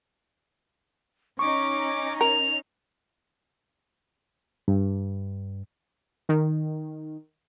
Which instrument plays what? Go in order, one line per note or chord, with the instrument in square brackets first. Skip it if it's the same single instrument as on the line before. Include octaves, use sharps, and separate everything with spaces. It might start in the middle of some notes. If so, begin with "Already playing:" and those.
[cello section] C#4 D#4 [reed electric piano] C#6 [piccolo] D6
[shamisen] A#4 [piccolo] F7
[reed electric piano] G2
[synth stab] D#3